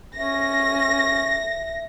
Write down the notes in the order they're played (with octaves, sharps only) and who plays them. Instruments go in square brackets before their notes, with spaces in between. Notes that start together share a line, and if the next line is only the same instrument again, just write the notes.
[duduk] C#4 [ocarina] E5 [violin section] A#6